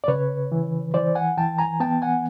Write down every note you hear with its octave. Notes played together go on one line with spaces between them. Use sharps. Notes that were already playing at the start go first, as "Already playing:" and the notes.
D5
C#3 B4 C#5
E3
E3 C5 D5
F#5 G#5
E3 G5 A5
G#5 A#5
B3 G5 A5
F#5 G#5